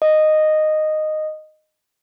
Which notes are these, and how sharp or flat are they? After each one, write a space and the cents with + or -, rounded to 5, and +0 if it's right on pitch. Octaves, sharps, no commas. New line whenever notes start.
D#5 -10